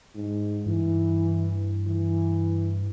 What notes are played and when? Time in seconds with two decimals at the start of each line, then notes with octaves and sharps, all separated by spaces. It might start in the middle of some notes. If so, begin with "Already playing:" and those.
0.15 G#2
0.66 G2 E3
1.87 E3